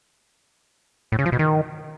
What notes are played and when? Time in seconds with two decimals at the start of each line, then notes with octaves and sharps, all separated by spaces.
1.12 A2
1.19 C#3
1.26 F3
1.32 B2
1.39 D#3